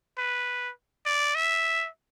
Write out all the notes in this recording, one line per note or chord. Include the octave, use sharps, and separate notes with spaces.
B4
D5
E5